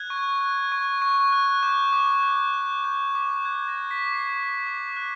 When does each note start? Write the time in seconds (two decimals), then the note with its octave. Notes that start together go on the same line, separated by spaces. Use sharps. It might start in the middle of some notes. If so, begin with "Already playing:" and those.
Already playing: F#6 G#6
0.10 C#6
0.41 F#6
0.72 C#6
1.02 C#6
1.32 F#6
1.63 D6 G6
1.93 D6
2.23 G6
2.53 G6
2.84 G6
3.15 D6
3.45 F#6 G#6
3.68 A#6
3.75 F#6
3.91 B6
4.06 D6
4.13 C7
4.36 D6
4.67 D6
4.96 F#6